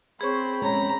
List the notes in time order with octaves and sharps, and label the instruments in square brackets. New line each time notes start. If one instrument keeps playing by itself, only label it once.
[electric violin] C4 B5 [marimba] G#4 C#5 C#6 [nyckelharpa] C5
[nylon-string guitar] F2 G#3 C#4 [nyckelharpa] A#5